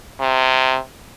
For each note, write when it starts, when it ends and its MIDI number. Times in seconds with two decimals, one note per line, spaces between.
0.20 0.78 48